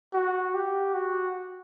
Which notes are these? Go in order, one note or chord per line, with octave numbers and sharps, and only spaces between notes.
F#4
G4
F#4